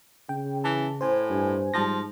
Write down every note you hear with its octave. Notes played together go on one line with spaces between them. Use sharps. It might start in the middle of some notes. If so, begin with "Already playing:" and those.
C#3 G5
E3 A5
A2 C5 G#5
G2
G#2 F3 G3 A5 A#6